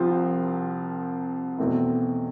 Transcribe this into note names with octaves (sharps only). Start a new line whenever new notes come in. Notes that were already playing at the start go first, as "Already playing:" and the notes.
Already playing: C2 C3 F3 C4 F4
E2 B2 A3 C4 E4